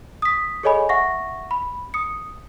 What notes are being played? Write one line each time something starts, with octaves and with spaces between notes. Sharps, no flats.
D#6 B6
G#4 A4 C#5 D#5 G#5 B5
E5 F#5 C#6 A#6
B5
D#6 C#7